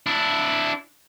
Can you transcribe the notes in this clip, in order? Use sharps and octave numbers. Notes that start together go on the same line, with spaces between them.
D4 E4